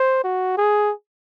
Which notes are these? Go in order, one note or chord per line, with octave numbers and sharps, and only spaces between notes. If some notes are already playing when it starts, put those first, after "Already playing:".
Already playing: C5
F#4
G#4